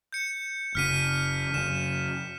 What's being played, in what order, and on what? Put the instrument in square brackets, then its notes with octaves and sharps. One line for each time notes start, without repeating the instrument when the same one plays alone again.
[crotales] G6 C#7
[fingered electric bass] F#1 C#3 [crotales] F6 B6 D#7
[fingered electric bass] F#2 C#3 [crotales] E7